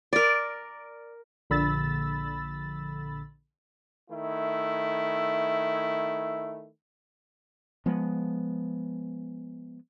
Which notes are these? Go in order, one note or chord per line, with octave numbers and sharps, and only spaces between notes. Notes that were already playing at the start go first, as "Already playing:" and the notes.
A#4 D5
A#1 D3 B5 E6 A6
D#3 A3 E4
F3 G#3 B3